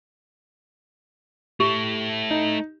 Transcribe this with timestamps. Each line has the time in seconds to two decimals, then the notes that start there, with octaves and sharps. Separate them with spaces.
1.60 A3 E4 G4
2.31 D#4